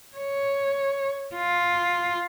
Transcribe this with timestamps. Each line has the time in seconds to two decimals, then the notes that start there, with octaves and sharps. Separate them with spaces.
0.16 C#5
1.36 F4